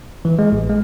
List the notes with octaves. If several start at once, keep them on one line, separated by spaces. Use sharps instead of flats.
E3
G#3
A1
G#3